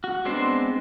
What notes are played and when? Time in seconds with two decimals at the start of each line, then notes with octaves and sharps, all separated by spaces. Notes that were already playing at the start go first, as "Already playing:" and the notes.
0.04 F#4
0.25 G#3 B3 C4 D4 C5